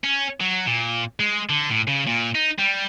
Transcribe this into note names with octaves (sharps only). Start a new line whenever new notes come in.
C#4
F#3
A#2
G#3
D3
A2
C#3
A#2
D#4
G3